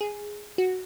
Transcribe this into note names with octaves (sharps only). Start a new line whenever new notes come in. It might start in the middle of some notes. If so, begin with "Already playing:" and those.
G#4
F#4